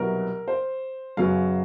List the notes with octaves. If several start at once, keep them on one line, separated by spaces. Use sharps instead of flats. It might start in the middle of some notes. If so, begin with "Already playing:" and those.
Already playing: C2 B2 F#3 B3 A#4
C5
F#2 C#3 F#3 B3 F5